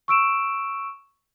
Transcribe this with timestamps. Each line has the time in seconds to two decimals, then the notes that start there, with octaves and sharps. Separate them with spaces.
0.08 C#6 E6 D7 E7